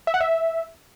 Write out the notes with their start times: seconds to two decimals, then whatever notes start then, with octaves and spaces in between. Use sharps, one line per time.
0.07 E5
0.14 F#5
0.21 E5